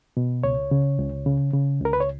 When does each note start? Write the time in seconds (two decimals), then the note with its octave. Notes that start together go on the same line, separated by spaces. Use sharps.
0.17 B2
0.44 C#2 C#5
0.71 C#3
0.99 C#2
1.26 C#3
1.54 C#3
1.81 C#2 A#4
1.93 B4
2.00 C#5